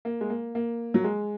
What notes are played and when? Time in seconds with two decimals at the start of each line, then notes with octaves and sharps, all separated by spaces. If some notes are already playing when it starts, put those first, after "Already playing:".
0.05 A#3
0.21 G#3
0.30 A#3
0.55 A#3
0.94 F#3
1.04 G#3